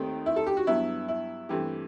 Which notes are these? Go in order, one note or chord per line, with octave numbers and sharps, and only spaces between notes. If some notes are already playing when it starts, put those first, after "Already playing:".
Already playing: D#2 D#3 A3 C4
E4
A4
G4
F#4
G2 F#3 B3 E4
E4
G2 E3 A3 C4 G4